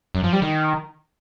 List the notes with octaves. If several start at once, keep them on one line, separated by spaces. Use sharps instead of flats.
F#2
F3
G3
D#3